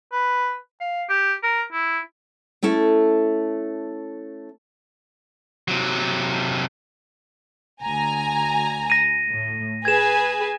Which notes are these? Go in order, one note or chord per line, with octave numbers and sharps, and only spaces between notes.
B4
F5
G4
A#4
E4
A3 C#4 E4 A4
C3 F#3
D2 G#5 A#5
A#6 D#7
A2
G#4 B4 G#5 G#6 E7